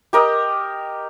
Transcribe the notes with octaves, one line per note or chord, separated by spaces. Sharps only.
G4 A#4 D#5